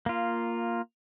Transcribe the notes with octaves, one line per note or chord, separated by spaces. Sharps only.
A#3 F4